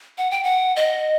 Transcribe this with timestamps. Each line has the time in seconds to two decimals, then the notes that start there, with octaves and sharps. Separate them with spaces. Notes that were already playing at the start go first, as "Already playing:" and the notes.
0.18 F#5
0.31 G5
0.43 F#5
0.76 D#5